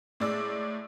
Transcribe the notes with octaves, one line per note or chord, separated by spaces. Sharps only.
A2 G#3 D5 E6